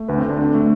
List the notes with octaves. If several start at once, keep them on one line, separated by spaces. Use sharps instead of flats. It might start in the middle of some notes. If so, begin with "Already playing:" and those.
Already playing: A3
D2 B4
C4
D2
D4
D3
A3